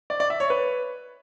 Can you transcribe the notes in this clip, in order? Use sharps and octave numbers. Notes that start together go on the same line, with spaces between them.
D5
D5
E5
C#5
B4